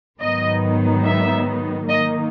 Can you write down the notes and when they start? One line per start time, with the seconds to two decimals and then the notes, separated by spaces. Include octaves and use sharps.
0.19 G#2 D#3 F#3 B3 D#4 D#5
1.04 E5
1.89 D#3 A#3 D#4 D#5